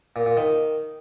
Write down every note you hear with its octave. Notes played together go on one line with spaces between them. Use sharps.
A#2
A#2
D#3